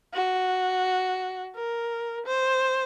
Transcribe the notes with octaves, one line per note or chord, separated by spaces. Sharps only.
F#4
A#4
C5